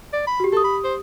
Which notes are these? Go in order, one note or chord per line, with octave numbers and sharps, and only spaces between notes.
D5
B5
F#4 G4
G4 A4 D#6
B5
C5